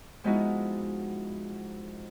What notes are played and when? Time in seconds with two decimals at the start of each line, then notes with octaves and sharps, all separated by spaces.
0.24 F3 G#3 B3 D#4 E4 F#4